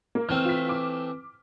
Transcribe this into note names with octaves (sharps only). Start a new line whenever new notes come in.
A#3
E3 A3 C4 F6
F4 B6
D6